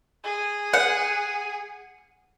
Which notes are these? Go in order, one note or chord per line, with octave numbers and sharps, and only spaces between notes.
G#4
F#5